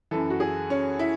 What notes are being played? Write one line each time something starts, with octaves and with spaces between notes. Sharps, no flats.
F#2 E3 A4
F#4
G#4
C#4
E4